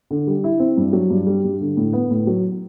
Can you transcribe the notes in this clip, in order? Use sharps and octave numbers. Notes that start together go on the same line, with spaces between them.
D3
G3
E4
C4
G2
F#3
G2
G3
G2
D3
A2
B3
A2
F#3